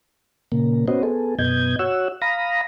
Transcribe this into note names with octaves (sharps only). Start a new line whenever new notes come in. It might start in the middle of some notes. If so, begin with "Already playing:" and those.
A#2 C#3 A#3
B3 C#4 F#4 C5 D#5
B3 G#4 A4
F#2 B2 B3 D#5 G6 G#6
F#4 C#5 F#5 E6
F5 A#5 B5 D#6 A#6